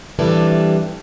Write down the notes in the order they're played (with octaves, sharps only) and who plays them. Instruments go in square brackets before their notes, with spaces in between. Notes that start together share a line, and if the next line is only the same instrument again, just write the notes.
[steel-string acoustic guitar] G2 C3 E3 G3 D4 A4